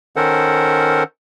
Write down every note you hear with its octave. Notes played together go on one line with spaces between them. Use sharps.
D#3 C#4 A4 A#4 C5 F#5